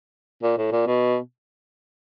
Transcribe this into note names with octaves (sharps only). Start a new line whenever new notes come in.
A#2
A2
A#2
B2